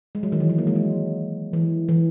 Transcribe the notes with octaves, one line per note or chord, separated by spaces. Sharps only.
G#3
F#3
D#3
E3
F#3
A#3
G#3
F#3
E3
E3